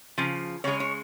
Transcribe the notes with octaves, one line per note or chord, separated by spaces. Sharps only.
C#3 F3
C#3 G#3 C#5
C#5